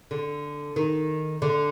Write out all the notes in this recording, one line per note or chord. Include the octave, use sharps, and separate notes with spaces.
D3
D#3
D3